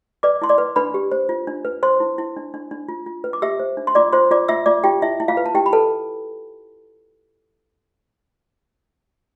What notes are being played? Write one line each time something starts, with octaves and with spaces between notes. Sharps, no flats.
B4 D5 D6
E4 C6
D5 D6
B4
D4 B4 B5
G4
C5
F4
D4
B4
C5 C6
E4
E4
D4
D4
D4
F4
F4
B4
D6
G4 E5 E6
C5
D4
C6
F4 D5 D6
F4 C5 C6
F4 D5 D6
F4 E5 E6
F4 D5 D6
F4 G4 G5
E4 E5
E4
F4 F5
B4
A5
E4 G4 G5
B5
A4 B4 A5